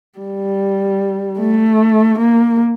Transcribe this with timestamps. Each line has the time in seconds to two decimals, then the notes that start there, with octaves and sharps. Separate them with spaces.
0.19 G3
1.39 A3
2.19 A#3